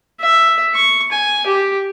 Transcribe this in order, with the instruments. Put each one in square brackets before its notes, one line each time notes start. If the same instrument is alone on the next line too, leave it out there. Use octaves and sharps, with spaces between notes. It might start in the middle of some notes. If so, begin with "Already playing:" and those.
[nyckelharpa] E5
C#6
G#5
G4